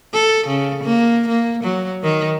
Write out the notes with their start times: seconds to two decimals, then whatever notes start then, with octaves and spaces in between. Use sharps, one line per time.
0.13 A4
0.47 C#3
0.83 A#3
1.28 A#3
1.63 F#3
2.03 D#3